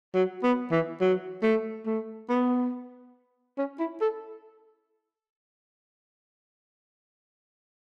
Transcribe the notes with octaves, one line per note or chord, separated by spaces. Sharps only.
F#3
B3
E3
F#3
A3
A3
B3
C#4
E4
A4